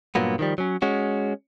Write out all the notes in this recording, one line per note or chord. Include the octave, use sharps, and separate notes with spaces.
G2 A#2 F#3 A#3 B3
D#3 F3 G3
F#3 C#4
G#3 C#4 F#4